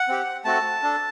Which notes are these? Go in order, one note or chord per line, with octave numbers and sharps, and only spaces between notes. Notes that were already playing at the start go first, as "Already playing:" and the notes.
Already playing: F#5
C4 G4
A3 C4 F#4 A4 A5
D4 A4